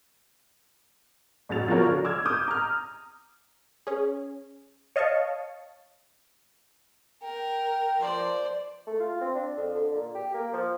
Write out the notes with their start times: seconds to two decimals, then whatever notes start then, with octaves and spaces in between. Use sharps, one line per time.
1.49 A1 F#2 F#3 A6 F7
1.68 F3 B3 F4 F#4 A#4 C#5
1.87 D3
2.05 D6 E6 F6 G#6
2.26 D6 D#6 G6
2.48 A#5 F6
3.87 C#4 G#4
4.96 C#5 D#5 F5 A5 C#6
7.23 A#4 G5
8.00 F3 C5 D5
8.87 A3
9.00 F4
9.21 C4
9.35 D4
9.57 F2
9.75 D3
9.95 A#2
10.15 G4
10.34 A#3
10.53 F3